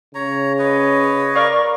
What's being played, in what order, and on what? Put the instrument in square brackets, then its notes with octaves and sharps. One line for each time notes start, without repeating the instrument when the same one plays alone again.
[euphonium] C#3 [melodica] C#5 A#5
[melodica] B4 C#5 D#5
[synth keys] A#4 D5 F5 [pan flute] C#6